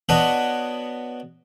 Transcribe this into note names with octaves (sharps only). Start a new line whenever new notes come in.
B3 D4 F#4 C#5 D#5 F#5